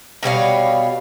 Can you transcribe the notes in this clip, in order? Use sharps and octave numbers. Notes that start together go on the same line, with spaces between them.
B2 G3 C#5 F5